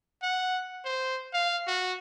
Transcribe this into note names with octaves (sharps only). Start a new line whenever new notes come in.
F#5
C5
F5
F#4